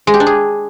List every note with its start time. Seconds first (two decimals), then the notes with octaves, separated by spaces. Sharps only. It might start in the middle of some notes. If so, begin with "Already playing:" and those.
0.07 G#3
0.14 G4
0.20 D4
0.27 G#4